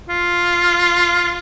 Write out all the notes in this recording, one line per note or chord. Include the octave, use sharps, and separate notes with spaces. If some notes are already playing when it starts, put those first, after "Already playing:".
F4